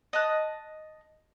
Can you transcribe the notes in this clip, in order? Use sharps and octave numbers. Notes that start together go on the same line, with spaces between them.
D#5 A5 F#6